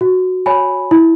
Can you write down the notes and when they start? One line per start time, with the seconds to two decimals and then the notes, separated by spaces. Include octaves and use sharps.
0.01 F#4
0.46 C#5 G#5 B5
0.91 E4